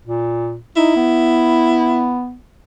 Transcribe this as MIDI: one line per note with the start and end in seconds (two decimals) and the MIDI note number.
0.05 0.58 46
0.77 0.92 63
0.77 2.16 64
0.96 2.35 59